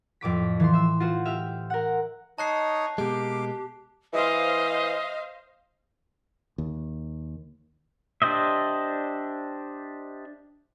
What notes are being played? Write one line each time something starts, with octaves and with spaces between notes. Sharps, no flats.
F2 A2 D6 B6
E3 F3 C6
E5 E6
F4 F#4 C5
G4 E5 F6
A#4 F#5
D#4 C#5 D#5 A5 F#6 C7
B2 G#3 A#3 G4 D6
E3 C5 D#5 F5
D#2
D4 G4 C5 D#5 E5